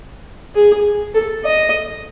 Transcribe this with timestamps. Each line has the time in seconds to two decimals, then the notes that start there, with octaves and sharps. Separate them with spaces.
0.55 G#4
1.14 A4
1.44 D#5